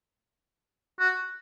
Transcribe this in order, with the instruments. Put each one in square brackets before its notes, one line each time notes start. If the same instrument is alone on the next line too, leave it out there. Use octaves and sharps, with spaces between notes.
[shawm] F#4